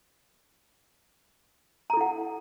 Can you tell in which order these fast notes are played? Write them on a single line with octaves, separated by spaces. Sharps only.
A#5 A4 E4 F#5